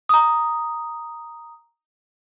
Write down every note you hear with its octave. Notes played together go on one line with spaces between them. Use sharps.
A#5 D#6